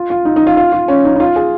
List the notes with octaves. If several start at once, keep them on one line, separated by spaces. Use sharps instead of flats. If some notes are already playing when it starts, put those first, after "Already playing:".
Already playing: F4
F4
D#4
D#4
F4
F4
F4
C#4
D#4
D#4
F4
G#4